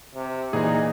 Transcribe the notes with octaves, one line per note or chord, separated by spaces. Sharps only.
C3
A#2 E3 D#4 G#4